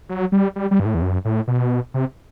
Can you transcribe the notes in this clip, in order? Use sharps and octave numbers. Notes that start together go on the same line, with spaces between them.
F#3
G3
G3
G3
G2
A2
E2
F#2
A2
B2
C3